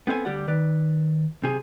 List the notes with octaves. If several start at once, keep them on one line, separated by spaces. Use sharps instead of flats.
B3 C4 A4 F5 G#5
D2 G3 G4 D5 F#5
D#3 B4 D5
B1 C3 G#4